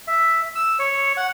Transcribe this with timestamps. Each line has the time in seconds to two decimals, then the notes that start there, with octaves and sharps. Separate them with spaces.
0.08 E5
0.55 E6
0.79 C#5
1.17 F#5